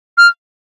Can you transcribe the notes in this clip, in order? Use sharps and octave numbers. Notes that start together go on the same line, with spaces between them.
F6